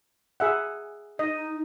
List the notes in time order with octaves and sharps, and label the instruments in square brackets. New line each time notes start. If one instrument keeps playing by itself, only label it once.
[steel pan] G#4 E5 F#5
[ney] D#4 [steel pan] D#5